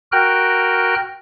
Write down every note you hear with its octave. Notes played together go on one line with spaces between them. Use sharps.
F#4 A#4 G5 F6 F#6